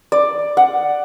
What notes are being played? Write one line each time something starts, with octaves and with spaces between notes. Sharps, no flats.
D5
F#5